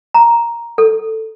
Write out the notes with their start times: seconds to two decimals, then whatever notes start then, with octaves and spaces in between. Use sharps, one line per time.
0.14 A#5
0.78 A4